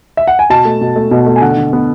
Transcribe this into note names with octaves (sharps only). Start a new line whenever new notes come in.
E5
F#5
G#5
B2 A5
A3
B2
A3
B2
A3
G#5
D3 F#5
D3
B3